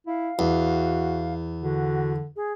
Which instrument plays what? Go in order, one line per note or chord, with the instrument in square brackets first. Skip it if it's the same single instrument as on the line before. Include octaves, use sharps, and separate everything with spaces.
[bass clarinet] E4 [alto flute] F5
[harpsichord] E2 [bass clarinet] F#4
[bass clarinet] D3 [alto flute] F#4
[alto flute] G#4